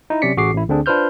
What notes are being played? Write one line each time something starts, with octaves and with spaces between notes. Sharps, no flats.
D#4 E4
C3 F#3 C#4 D5 B6 C#7
A1 F#4 G#4 D6 C7
A1 E4
D2 D3 C4 D4 G#4
D4 F4 B4 C5 F6 G6